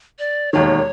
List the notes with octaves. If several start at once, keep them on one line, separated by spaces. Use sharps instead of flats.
D5
E1 D#2 D#3 C#5